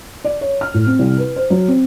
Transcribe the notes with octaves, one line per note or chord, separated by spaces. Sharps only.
D5
C#5
F6
A2
C4
C2
B4
C5
F#3
C4